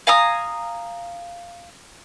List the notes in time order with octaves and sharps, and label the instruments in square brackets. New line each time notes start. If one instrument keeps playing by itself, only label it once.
[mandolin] F5 G#5 A#5 D#6